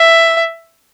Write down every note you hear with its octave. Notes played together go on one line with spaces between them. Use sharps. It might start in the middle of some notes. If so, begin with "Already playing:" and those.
Already playing: E5